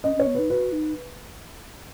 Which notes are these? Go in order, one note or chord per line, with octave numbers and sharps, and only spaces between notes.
C#4 D#5
C#4 C#5
B3
D#4 B4
F#4 B4
D#4